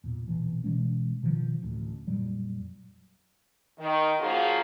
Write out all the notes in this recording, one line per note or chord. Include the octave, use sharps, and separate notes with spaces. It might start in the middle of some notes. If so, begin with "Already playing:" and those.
E2 A#2
B1 A#2 E3
B2 E3 G#3 C#4
B2 D#3 F3
D1 A1 D2
F2 A#2 F#3 G3
D#3
C#3 F3 A#3 F4 F#4 G#4